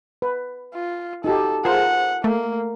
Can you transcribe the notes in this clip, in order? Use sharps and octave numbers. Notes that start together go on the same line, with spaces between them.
B4
F4
D#4 F#4 G4 A4
F4 G#4 A#4 C5 F#5
A3 A#3